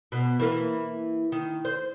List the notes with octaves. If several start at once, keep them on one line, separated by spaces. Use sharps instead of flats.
B2
E3 A#3
D#3
C5